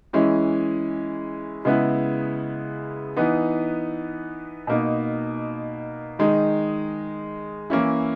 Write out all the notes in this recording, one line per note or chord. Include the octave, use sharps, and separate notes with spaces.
E3 G#3 C#4 E4
C#3 G#3 B3 E4
E3 B3 D#4
B2 A#3 D#4
D#3 G#3 D#4
E3 A#3 C#4 E4